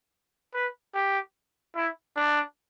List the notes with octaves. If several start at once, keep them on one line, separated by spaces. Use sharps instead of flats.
B4
G4
E4
D4